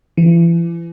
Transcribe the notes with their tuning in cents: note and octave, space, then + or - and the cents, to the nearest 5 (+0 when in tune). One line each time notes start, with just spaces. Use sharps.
E3 +40